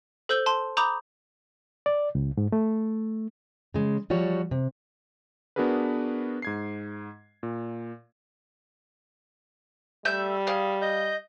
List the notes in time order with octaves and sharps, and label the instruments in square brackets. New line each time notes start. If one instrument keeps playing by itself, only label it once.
[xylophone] A4 C5 E6 G6 G7
A5 C6
A#5 B5 D6 D#6 G6 F7
[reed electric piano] D5
C#2
G#2
A3
[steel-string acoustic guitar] C#3 G#3
F3 G3 F#4 C#5
C3
[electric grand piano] B3 D4 F#4 G#4 A#4 B4
G#2 G#6 C7
A#2
[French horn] G3 [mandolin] A3 E5 G6
[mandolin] G#4 F5
[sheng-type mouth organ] D#5 G6